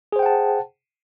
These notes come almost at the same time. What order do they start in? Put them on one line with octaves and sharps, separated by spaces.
G#4 C5 G5 F#5 A5